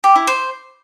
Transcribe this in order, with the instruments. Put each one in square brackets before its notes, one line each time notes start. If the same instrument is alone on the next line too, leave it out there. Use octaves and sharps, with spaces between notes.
[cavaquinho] G4
E4
C5